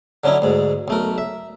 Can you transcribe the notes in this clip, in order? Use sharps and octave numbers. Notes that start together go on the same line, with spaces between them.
D3 F#3 C#4 D#4 E4
D2 G#2
B1 A3 A#4
E5